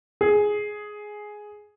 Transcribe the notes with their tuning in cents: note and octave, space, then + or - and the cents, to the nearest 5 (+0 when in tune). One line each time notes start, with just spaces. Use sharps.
G#4 +5